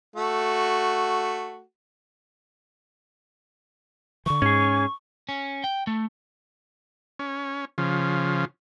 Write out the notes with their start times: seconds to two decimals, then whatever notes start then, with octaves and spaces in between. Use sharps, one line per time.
0.16 A3 F#4
4.26 D3 E3 C#6
4.42 G#2 C#4 G#4
5.29 C#4
5.64 G5
5.87 A3
7.19 C#4
7.78 C#3 F3